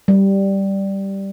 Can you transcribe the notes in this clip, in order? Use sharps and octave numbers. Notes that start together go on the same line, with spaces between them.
G3